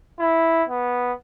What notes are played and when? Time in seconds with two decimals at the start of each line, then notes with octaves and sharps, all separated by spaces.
0.19 E4
0.69 B3